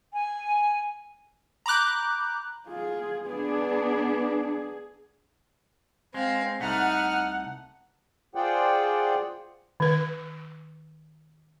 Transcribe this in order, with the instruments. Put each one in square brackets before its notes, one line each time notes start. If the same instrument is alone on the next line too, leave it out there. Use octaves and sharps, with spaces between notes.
[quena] G#5
[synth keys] A#5 B5 D6 F#6 G6
[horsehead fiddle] F4 G#4
[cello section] B3 D4 [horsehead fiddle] G#4
[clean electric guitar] G#3 [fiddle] C4 F5
[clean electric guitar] C2 A3 [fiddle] D#4 F6 [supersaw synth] F#5
[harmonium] F4 G#4 C5 D5 F#5 G5
[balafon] D#3 B4